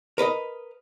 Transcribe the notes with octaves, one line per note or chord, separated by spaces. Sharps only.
A#4 B4 D5 D#5